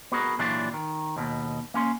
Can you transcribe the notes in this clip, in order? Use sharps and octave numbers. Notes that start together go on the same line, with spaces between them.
B3 F#4 G#4 A#4
A#2 E3 F#3 D4 F4 G4
D#3
D#2 B2
A#3 C#4 C6